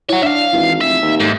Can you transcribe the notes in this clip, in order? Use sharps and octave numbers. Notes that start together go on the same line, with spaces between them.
E4 C#5 F#5
D4 E5 F5
G#1 E3
F1 E5 E6
D#2
G#2 A3